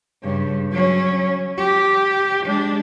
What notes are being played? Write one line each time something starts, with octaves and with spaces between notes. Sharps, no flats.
G2 C#3
F#3 C#4
G4
G#3 D4